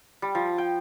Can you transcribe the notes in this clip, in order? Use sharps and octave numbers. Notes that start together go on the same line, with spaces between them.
G3
F3
G5